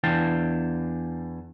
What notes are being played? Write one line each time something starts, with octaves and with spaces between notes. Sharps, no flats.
E2 E3 D4 F5 G5 A5